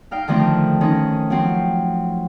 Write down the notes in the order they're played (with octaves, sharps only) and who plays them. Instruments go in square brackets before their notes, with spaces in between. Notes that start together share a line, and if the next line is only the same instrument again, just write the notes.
[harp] D#4 F5 G5
D3 D#3 F3 A3 C4
D#3 C4 C#4 D#4
F3 F#3 C4